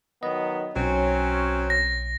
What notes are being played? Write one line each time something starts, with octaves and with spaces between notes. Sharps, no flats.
D#3 F#3 B3 D#5
B1 F#3 C4 C#4
A#6